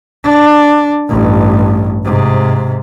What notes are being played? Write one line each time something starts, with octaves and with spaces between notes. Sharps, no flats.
D4
A1 G2
G#2 C3